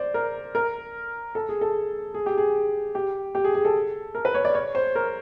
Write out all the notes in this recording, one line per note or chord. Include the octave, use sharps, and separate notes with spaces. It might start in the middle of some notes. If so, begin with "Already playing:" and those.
Already playing: C5 D5
A#4
A#4
A4
G#4
A4
G#4
G4
G#4
G4
G4
G#4
G#4
A4
A#4
B4
C#5
D5
C#5
C5
A#4